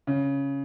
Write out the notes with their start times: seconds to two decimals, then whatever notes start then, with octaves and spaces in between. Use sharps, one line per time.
0.07 C#3